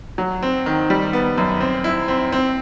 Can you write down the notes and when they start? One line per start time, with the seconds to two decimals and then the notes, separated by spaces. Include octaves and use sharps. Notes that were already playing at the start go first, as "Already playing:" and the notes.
0.18 F#3
0.43 C4
0.66 D#3
0.90 G3
1.13 B3
1.38 F#2
1.61 C4
1.84 E4
2.08 C4
2.32 C4